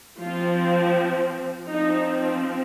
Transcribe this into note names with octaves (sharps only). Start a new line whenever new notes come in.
F3 C4 F4
F3 C4 D#4